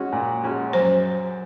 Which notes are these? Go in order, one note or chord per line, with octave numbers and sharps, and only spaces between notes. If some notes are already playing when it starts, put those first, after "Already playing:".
Already playing: G#3 C#4 F#4
A#2
G#3 C#4 F#4
F#2 C5